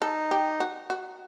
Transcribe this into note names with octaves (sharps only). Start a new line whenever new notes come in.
D#4 A4
G4
F#4
F#4